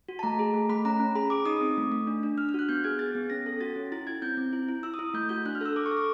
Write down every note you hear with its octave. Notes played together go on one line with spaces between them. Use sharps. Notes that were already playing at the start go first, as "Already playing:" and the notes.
F#4
A5
A3 A#5
G#4
A3
A3 B5
C#4 A#5
C#4
G#4 B5
G#4 D6
D#4 D#6
C4
A3
A3
D4
D4
D4 F6
F6
F#4 F#6
B3 G6
G#4 G#6
G#4 A6
B3
C#4 A#6
A4
F#4 A6
C#4
E4 A6
E4 G#6
C4 G6
C4
E4
E4
E4 E6
D#6
E4
A3 G6
F#4 G6
D4 F#6
F6
A4 E6
A4 D6
C#6
A4
D6